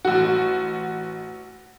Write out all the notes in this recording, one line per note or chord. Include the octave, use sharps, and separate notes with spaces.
A1 F#4